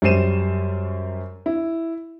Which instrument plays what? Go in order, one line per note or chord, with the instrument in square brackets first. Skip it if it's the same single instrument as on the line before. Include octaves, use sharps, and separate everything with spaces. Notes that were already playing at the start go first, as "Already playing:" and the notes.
[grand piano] F#2 G3 C5 C7 D#7 E7
E4